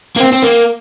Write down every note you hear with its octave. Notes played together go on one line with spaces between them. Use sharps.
A#3
C4
C4
A#3